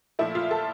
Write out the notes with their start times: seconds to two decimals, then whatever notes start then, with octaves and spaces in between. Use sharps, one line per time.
0.19 A#2 F3 A3 E4
0.35 F4
0.51 A4